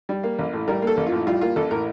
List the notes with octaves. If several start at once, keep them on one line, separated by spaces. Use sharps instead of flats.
G3
A#3
A1
A2
G3 A#4
A#3 A4
A1
F4
A2
G3 F4
A#3 F4
A1 A4
A2 A#4